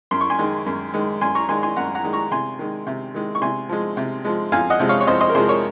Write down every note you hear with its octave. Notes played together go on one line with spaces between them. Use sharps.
F#2 C6
C#6
G#5 C6
D#3 G#3
F#2
D#3 G#3
F#2 G#5 C6
A#5 C#6
D#3 G#3 G#5 C6
G#5 C6
F#2 F#5 A#5
F#5 A#5
D#3 G#3
A#5 C#6
C3 G#5 C6
D#3 G#3
C3
D#3 G#3
C#6
C3 G#5 C6
F3 G#3
C3
F3 G#3
F2 F5 G#5
D#5 F#5
C3 F3 G#3
C#5 F5
C#5
F2 C5 D#5
C5 D#5
A#4
C3 F3 G#3 G#4 C5
A#4 C#5